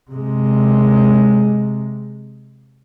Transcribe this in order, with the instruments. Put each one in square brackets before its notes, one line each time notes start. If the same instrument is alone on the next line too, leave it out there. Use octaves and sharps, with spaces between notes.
[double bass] C3 G#3